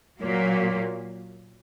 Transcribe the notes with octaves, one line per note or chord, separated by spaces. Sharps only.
A#2 F#3 A#3